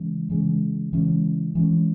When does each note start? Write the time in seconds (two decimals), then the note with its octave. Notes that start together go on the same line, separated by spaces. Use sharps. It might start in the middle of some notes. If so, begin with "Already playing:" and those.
Already playing: C#3 E3 G#3 C#4
0.30 C#3 E3 G#3 C#4
0.93 C#3 E3 G#3 C#4
1.55 E3 G#3 C#4